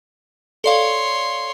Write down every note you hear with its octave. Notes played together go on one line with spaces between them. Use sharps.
A4 C#5 D5 F5 C6